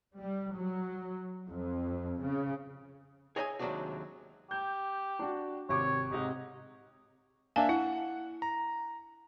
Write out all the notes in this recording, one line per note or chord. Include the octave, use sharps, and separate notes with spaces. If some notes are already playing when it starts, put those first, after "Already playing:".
G3
F#3
F2
C#3
G#4 C#5 D#5 E5 G5 G#5
D#2 C3 F#3 G#3 D4 F#4
G4 G6
D4 F#4
G#1 C3 C#5 D6
G#2 C3 D#4
A#3 D4 E5 F5 G#5 A5
E4 F#5
A#5